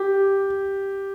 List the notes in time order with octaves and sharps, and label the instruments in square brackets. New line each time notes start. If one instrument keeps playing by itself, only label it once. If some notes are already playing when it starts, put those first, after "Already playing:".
Already playing: [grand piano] G4